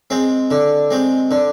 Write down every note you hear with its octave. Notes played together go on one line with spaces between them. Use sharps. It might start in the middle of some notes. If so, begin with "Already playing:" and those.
G#3 C4
D3
G#3 C4
D3